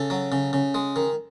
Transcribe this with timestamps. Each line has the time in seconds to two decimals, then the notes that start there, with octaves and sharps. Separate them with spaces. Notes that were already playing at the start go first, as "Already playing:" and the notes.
Already playing: C#3 A4
0.10 F#3
0.32 C#3
0.53 C#3
0.75 G#3
0.96 D#3